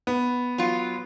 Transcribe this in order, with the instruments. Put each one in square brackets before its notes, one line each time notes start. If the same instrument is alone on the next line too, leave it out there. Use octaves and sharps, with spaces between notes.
[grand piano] B3
[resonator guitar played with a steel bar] F#3 F4